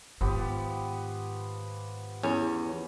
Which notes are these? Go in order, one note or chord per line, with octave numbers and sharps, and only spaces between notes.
G#2 D#3 F3 B3 G4
E2 C#4